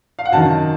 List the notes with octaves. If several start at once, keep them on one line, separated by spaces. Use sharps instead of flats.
F5
F#5
F#2 D#3 A5